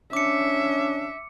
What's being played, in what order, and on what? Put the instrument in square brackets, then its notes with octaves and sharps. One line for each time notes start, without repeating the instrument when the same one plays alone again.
[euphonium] C#4 [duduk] D4 [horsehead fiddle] E5 [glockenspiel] D6 C#7